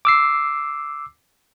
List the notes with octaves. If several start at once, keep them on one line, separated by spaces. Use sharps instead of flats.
D6 E6 C7